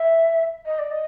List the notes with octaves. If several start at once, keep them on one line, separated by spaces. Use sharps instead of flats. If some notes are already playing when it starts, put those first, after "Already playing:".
Already playing: E5
D#5
D5
D#5